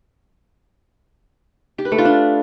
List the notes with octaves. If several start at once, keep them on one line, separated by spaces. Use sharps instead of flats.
G4
B4
A3
F4
D4